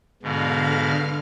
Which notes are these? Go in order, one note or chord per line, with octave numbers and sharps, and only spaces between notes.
G#2 B2 D3 F5 F6